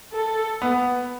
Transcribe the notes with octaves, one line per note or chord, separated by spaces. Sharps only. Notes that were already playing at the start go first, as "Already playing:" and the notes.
A4
B3